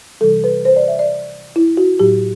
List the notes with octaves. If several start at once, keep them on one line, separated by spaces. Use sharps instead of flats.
C3 E3 G3 A4
B4
C5
D5
E5
D5
E4
F#4
A2 F#3 G4